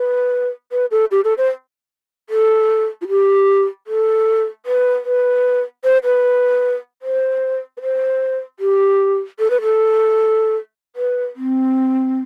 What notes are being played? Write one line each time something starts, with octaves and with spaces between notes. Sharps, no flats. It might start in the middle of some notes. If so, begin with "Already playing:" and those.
Already playing: B4
B4
A4
G4
A4
C5
A4
F4
G4
A4
B4
B4
C5
B4
C5
B4
C5
G4
A4
B4
A4
B4
C4